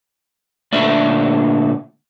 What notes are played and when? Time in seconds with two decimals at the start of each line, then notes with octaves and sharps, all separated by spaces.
0.73 A#2 D3 A3 D5 E5